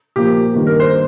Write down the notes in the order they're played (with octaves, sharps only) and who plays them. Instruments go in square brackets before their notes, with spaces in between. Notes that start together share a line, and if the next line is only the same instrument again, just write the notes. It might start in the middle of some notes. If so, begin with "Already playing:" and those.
[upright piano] A#2 F3 A#3 [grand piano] G4
[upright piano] G2 D#3 A#3 D4
[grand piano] A#4
C5